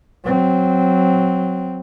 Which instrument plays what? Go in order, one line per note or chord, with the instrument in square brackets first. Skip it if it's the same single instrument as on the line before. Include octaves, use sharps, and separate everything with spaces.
[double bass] F#3 C4